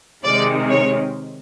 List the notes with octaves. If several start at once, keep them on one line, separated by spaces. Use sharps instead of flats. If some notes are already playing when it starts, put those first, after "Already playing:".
C3 D#3 G#3 D5
C#5